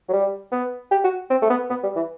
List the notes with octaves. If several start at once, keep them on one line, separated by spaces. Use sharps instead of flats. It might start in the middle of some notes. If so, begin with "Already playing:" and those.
F#3
G3
B3
G4
F#4
C4
A3
B3
B3
G3
E3